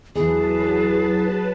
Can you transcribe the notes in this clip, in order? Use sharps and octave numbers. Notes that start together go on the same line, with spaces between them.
E2 E3 F#3 G#4 B4 A5